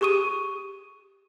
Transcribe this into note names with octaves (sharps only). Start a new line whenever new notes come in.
G4 G#4 C#6 D#6 D#7